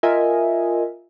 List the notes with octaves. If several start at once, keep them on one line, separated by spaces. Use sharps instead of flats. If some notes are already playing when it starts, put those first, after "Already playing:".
F4 A#4 D#5 E5 G#5